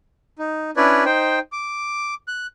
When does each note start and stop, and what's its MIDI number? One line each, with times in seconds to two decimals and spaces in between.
0.39 0.71 63
0.77 1.04 61
0.77 1.04 62
0.77 1.04 64
0.77 1.04 71
0.77 1.04 73
0.77 1.04 74
1.05 1.39 63
1.05 1.39 72
1.05 1.39 79
1.52 2.14 86
2.28 2.47 90